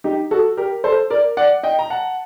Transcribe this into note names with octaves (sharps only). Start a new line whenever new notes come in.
D#4 G4
F#4 A4
G4 A#4
A4 C5
A#4 D5
D5 F#5
D#5 G5
A#5
F#5 A5